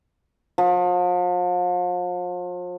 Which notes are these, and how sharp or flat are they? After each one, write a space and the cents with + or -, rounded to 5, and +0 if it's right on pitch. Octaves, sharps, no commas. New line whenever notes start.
F3 +40